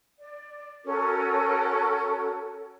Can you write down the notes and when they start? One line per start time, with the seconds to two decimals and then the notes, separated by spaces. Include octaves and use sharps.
0.21 D5
0.85 C#4 F#4 A4 A#4